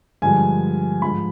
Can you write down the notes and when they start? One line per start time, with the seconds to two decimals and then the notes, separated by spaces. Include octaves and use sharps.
0.22 G2 D3 F3 G#3 G#5
1.02 G#2 F3 G#3 B5